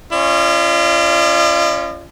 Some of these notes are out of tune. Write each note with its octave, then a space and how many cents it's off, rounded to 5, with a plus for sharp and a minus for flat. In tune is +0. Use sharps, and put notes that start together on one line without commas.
C#4 +0 F4 -40 D#5 -45